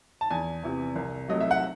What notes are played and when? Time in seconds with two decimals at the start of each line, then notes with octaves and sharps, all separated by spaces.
0.21 A5
0.30 E2 G#5
0.63 C3 E3
0.95 C2
1.28 C3 F#3 A3 D#5
1.41 E5
1.51 F#5